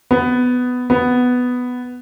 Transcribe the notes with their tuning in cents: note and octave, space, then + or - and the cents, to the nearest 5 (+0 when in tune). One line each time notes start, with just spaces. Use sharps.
B3 +10
B3 +5